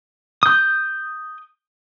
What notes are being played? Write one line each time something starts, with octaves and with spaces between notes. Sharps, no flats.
D#6 G6